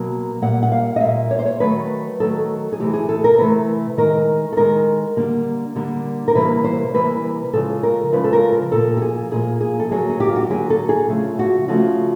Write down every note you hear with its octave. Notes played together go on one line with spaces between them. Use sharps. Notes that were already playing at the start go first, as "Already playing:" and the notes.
Already playing: B2 F#3 A#3
A#2 G3 A#3 F#5
F#5
F5
D#5
A#2 G3 A#3 E5
C#5
C5
C#5
D#3 F#3 A3 B4
D#3 F#3 A3 A4
G#4
C3 E3 A3 G4
G#4
A4
A#4
C3 E3 A3 B4
D#3 G#3 A#4
A4
D#3 G#3 A#4
D3 G3 A#3
D3 G3 A#3
A#4
C3 E3 G3 A#3 B4
C5
C3 E3 G3 A#3 B4
C#3 F3 G#3 A4
A#4
C#3 F3 G#3 B4
A4
A#4
A#4
A#2 F3 A#3 A4
G4
G#4
A#2 F3 A#3 G#4
G#4
A4
D3 F#3 A#3 G#4
G#4
G4
F4
F#4
G4
D3 F#3 A#3 G#4
A4
G#4
C#3 F3 A3
F#4
C#3 F3 A3 F#4